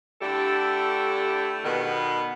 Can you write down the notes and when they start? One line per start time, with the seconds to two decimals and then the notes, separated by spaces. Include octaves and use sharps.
0.21 D3 A3 D4 E4 G4 A4
1.64 B2 D#3 B3